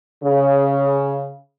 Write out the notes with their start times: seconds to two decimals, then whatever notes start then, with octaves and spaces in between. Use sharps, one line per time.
0.23 C#3